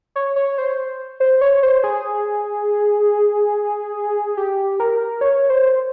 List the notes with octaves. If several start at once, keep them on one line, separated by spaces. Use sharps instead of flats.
C#5
C#5
C5
C5
C#5
C5
G#4
G4
A#4
C#5
C5